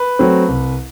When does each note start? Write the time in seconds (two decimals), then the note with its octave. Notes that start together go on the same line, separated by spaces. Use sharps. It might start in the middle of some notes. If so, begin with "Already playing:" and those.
Already playing: B4
0.19 F#3 A3 C4
0.48 C2